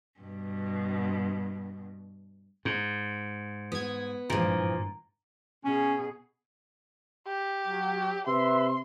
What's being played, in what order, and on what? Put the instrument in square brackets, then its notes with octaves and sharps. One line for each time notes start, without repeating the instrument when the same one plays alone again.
[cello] G2 B2
[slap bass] G#2
[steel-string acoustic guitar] B3 [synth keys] D#6 G#6
[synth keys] G#1 G2 [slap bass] A#2 [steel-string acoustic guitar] E3 F3 [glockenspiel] A#5
[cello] B2 G#4 [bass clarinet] C#4
[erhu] G4
[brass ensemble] F#3
[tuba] C3 [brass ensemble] B4 E5 [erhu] C6